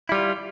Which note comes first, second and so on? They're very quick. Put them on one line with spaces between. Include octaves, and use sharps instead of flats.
E4 G3 F4